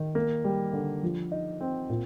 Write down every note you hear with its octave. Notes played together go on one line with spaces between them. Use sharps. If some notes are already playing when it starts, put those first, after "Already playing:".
Already playing: D#3
A#3
G3
D3
F3
D#4
C4
A#2